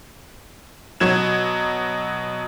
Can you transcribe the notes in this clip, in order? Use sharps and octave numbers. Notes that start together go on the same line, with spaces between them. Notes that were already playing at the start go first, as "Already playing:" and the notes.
B2 F#3 G#6 E7